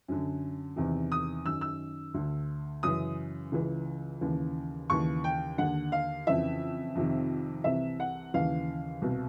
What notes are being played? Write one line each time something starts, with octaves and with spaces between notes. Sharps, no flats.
F#2 D3
E2 C3 D#3
D#6
F#2 D#3 E6
E6
D2 D3
F#2 C#3 E3 D#6
C#2 C#3 E3
D#2 C#3 E3
D#2 C#3 E3 C#6
G5
D#2 D3 F#5
F5
F2 C#3 E3 E5
F2 C3 D#3
C2 C3 E3 E5
F#5
D#2 C#3 E3 F5
C2 B2